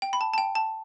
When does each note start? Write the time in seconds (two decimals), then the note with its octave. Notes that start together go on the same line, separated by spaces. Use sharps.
0.02 G5
0.13 B5
0.21 A5
0.34 A5
0.38 G5
0.55 A5